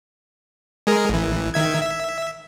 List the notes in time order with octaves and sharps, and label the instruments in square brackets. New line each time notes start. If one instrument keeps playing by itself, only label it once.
[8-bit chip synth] G#3 G#4 A#4
A1 E3
D#3 E5 G#6
E5